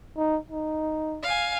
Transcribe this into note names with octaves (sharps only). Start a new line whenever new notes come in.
D#4
D#4
F5 G#5